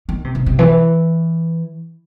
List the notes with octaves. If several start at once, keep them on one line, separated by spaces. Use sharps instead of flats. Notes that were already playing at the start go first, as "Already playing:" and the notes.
D#3
C3
C3
C3
E3